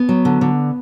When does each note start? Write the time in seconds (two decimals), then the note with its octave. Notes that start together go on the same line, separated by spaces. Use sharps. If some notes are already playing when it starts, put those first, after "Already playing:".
Already playing: B3
0.09 F#3
0.25 D3
0.41 D3